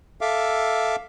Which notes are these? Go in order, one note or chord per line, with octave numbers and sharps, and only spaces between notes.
A4 E5 F5 D6